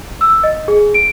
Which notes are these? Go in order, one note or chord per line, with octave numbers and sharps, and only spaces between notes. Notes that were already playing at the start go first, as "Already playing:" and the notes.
E6
D#5
G#4
D7